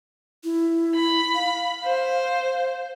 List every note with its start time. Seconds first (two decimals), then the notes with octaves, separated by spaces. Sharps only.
0.44 E4
0.95 B5
1.35 F5
1.84 C5